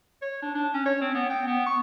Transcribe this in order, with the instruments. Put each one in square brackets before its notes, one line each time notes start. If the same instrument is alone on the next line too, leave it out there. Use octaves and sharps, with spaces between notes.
[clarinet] C#5
D4
D4
C#4
C#5
C4
B3
G5
B3
C#6